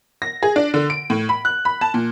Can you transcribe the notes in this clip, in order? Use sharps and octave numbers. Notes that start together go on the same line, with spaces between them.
A#6
G#4
D4
D3
D7
A2
B5
F#6
B5
A5
A#2